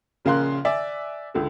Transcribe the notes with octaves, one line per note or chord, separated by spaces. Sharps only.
A#1 C#3 A#4 F5 C6 F#6
D5 E5 G#5 D6 E6
C#2 D3 A4